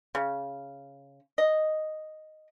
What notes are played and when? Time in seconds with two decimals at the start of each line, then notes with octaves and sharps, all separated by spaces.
0.15 C#3
1.38 D#5